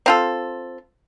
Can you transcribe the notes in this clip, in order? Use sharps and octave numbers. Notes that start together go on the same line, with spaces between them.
C4 F4 A4